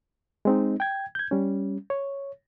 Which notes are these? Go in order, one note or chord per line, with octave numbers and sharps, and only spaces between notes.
G#3 C4 D#4
G5 G#6
G6 G#6
G3 C#4
C#5